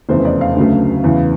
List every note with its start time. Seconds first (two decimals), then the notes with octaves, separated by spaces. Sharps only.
0.09 F1 E2 C#3 C5
0.25 D5
0.41 F5
0.56 D2 C#3 F#3 A3
1.04 E2 C#3 E3